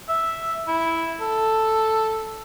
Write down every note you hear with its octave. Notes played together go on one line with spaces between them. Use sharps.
E5
E4
A4